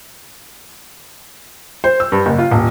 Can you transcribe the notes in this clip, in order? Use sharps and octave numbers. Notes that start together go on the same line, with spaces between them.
C5
E6
G2
F#1
F4
D#1